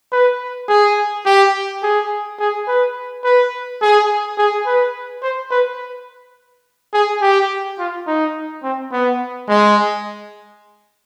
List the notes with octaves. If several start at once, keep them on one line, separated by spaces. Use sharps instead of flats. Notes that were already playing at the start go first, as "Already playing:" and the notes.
B4
G#4
G4
G#4
G#4
B4
B4
G#4
G#4
B4
C5
B4
G#4
G4
F4
D#4
C4
B3
G#3